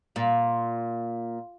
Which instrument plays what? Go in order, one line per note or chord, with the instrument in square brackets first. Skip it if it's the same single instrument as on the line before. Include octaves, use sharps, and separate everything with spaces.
[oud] A#2